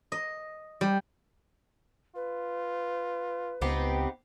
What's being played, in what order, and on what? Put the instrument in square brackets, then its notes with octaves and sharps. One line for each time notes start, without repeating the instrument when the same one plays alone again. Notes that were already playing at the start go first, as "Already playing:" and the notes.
[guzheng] D#5
G3
[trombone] F4 [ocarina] B4
[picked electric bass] C#2 [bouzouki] B3 C4 G4 [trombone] D#4